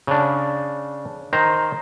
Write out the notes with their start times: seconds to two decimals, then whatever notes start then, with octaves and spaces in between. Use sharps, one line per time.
0.07 C#3 D4
1.33 D#3 C5 A#5